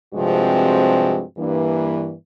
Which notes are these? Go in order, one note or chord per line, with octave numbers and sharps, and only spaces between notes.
G2 C3 F3 G#3 C4 F#4
G2 E3 A#3